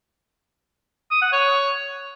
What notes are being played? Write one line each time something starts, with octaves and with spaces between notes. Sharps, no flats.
D#6
F#5
C#5